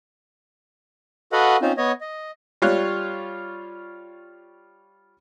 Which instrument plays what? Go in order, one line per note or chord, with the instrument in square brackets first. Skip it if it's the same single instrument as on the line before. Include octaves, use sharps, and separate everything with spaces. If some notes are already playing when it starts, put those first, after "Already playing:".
[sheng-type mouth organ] F#4 A4 B4 D#5 F5 F#5
C4 C#4 D#4 F4 C5
B3 C#5 D#5
D#5
[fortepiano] G3 F4 C#5 F#6